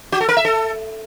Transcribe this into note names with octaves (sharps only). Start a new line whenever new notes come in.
F#4
A4
A#4
E5
A4